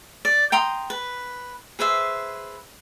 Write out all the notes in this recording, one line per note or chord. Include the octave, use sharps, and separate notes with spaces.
D5
G5 A#5 C6 D#6
B4
G#4 B4 C5 E5